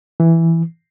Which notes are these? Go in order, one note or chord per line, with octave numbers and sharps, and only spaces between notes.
E3